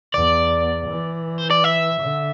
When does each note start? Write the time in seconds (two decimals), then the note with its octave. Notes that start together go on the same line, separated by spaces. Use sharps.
0.14 E2 D5
0.90 E3
1.38 C5
1.50 D5
1.64 E5
2.01 D3